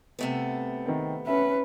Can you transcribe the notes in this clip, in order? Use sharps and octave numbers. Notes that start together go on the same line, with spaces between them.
C3 A3 B3
D#3 C4
C#4 B4 E5